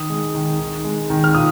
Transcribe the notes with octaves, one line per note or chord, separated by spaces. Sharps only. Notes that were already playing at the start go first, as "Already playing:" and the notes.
Already playing: D#3 D#6
G#3
D#3
D#3
G#3
D#3
F6
A#2 D#6